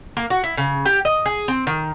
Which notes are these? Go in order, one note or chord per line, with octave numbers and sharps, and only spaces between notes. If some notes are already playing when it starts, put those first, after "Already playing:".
A#3
F#4
E4
C#3
G4
D#5
G#4
C4
D#3